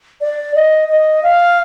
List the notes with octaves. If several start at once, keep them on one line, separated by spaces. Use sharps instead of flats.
D5
D#5
D#5
F5